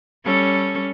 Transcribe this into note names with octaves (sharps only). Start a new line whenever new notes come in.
G3 C#4 A4